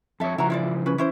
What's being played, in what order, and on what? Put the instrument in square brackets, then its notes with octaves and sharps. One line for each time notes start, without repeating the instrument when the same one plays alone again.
[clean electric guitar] F2 C#5 [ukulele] A4 E5
[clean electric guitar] C#3 E3 F3 [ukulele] E4 F#4 A#5
[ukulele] E4 F4 D5
C#4 G#4 B4
[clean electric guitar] E3 [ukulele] C#4 E4 C5